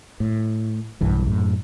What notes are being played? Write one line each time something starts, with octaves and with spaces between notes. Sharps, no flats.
A2
B1 G2 E3
F#2 A2